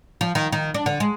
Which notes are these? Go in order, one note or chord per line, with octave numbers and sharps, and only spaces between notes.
F3
D#3
D#3
D4
D3
G#3